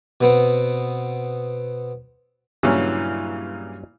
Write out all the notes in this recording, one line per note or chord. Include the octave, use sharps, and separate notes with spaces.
B2 B3 C4
G2 A#2 C#3 E3 F#3 C#4